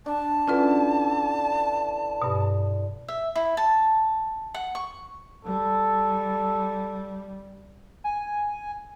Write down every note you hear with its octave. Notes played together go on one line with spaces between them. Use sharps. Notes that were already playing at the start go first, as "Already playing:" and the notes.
D4 A5
D3 E3 C#4 F4 B4
G2 B2
E5
E4
A5
F#5
C#6
G3 A4
G#5